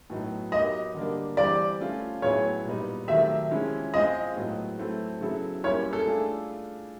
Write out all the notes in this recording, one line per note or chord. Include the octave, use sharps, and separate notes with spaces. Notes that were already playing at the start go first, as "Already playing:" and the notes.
A2 F#3 B3 D#4
F#3 B3 D#4 G4 A#4 D#5
D3 G3 A#3 D4
E3 G3 C4 D5
A3 C#4 F4
A2 F#3 B3 E4 G#4 C#5
A#2 G3 B3 D#4
C3 D#3 F#3 A3 E5
C3 F3 G#3 C#4 E4
G#3 C4 F4 G#4 D#5
A2 F#3 B3
F#3 A3 C4 E4
C#3 F#3 B3 E4 A4
G3 A#3 C#4 E4 C#5
A4
A3 D4 F4 G#4